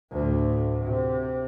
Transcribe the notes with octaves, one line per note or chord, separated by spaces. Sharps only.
D2 A2
C3